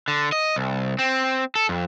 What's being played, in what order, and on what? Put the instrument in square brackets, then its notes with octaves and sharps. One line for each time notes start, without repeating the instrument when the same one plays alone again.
[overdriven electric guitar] D3
D#5
C2
C4
A4
F2